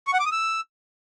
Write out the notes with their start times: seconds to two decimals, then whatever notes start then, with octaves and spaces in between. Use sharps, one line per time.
0.07 C#6
0.13 F#5
0.20 D6
0.26 D#6
0.32 E6